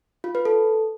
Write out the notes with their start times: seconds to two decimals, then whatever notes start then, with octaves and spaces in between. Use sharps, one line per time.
0.24 F4
0.35 B4
0.45 A4